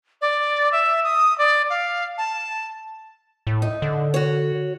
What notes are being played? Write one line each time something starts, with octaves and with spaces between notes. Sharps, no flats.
D5
E5
D#6
D5
F5
A5
A2
D#4
D3
F#4 C#5